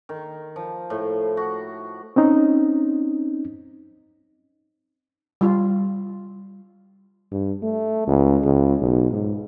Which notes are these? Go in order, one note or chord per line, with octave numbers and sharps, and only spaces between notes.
D#3
F3
A2
F#4
C4 C#4 D#4
G3 F4
G2
A3
C#2
C#2
B1
G#2